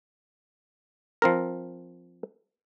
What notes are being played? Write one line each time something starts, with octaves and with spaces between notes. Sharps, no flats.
F3 C4 A#4